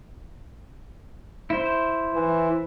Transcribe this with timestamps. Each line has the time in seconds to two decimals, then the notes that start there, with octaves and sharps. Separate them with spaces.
1.50 E4 C5
2.14 E3